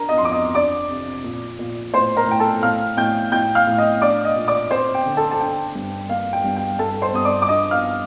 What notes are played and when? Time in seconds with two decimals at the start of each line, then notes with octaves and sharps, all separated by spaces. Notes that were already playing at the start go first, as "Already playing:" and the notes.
Already playing: D4 A#4 A#5
0.09 D#5 D#6
0.18 C6
0.20 F2 D6
0.32 D#5 D#6
0.54 D4 D5 D6
0.89 C3
1.24 A#2
1.59 A#2
1.94 A2 C5 C6
2.17 A#4 A#5
2.28 A2 G5
2.40 A4 A5
2.63 A2 F5 F6
2.97 A2 G5 G6
3.32 A2 G5 G6
3.55 F5 F6
3.67 A2
3.78 D#5 D#6
4.01 D4 D5 D6
4.24 D#5 D#6
4.36 A#2
4.48 D5 D6
4.71 C4 C5 C6
4.94 G5
5.06 D3
5.17 A4 A5
5.31 A5
5.40 D4 G5
5.75 G2
6.09 A#3 F5
6.33 G5
6.44 G2
6.56 G5
6.79 G2 A4 A5
7.02 C5 C6
7.14 G2 D#6
7.25 D5 D6
7.42 D6
7.48 D4 D#5 D#6
7.71 F5 F6